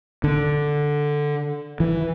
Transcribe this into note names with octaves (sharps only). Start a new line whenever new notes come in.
D3
E3